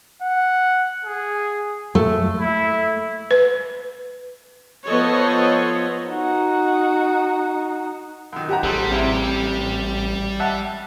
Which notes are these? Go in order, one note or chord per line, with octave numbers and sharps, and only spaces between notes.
F#5
G#4
A3
E4
B4
F3 B3 A4 C5 C#5 D#5
D#4 F#4
F#2 D#3
G4 F#5 A#5
A1 G3 G#4 A4 C5
C3 C4 E4
E5 F#5 A5